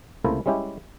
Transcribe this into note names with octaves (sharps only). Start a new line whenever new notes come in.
C#2 C3 A3 A#3 E4 C5
G3 G#3 C#4 E4 G4